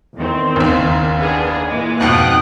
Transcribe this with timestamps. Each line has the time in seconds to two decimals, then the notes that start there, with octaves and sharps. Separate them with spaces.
0.15 E2 D#3 C4
0.56 F#1 D#2
1.18 B3 D4 G#4
1.67 A#2 E3 G#3
2.01 F2 G#2 B2 G5 D#6 F#6